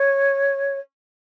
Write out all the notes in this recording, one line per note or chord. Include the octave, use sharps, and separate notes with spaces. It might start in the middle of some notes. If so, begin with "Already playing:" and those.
Already playing: C#5